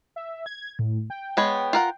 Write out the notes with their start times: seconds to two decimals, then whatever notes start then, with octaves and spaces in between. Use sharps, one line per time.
0.16 E5
0.46 G#6
0.79 A2
1.10 G5
1.37 G#3 B3 C#5
1.73 F4 A#4 F#5